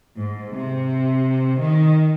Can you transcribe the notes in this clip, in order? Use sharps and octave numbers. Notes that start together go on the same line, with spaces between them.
G#2
C3
D#3